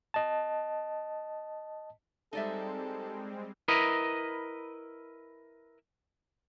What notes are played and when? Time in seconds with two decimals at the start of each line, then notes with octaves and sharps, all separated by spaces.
0.14 D#5 A5
2.33 G3 G#3 C4 D#4 A4 D5 E5
3.68 E4 A#4 B4 D#5